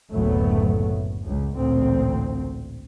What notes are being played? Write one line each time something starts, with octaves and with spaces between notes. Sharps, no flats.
F#1 D2 A2 F#3 A3 B3
C#2
A1 D2 A#2 C4